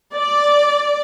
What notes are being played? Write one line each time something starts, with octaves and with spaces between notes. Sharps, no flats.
D5